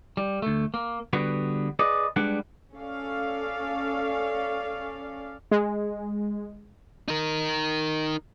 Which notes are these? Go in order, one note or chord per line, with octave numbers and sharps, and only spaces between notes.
G3
D2 A3
A#3
D3 G3 B3 F#4 B4
G#4 B4 D5 D#5
G3 G#3 D4 B4 F#5
C#4 A4 D5 F5
G#3
D#4 A#4